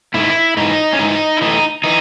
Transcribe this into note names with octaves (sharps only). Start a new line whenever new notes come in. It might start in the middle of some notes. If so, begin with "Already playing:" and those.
G#2 D#3 E4
G#2 E3 D#4
C#4
G#2 E3 D#4
E4
A2 E3 D#4
E3 D#4